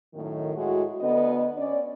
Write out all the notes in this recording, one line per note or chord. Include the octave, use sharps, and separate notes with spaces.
F#2 A2 D#3
A2 G#3 F#4
D2 D3 B3 D#5
C#4 D5